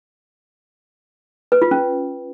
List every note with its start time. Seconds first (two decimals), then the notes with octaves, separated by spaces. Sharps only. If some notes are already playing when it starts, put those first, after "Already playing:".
1.52 B4
1.62 F4
1.71 C#4